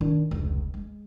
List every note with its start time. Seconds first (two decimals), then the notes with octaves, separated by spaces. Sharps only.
0.01 D#3 D4
0.31 F1 C#2
0.74 G#3